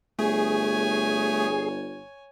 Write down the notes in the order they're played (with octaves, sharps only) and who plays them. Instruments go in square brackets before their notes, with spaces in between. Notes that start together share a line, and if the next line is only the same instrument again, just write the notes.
[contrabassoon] G1 [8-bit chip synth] A3 [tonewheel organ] G#4 [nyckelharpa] C#5 G#5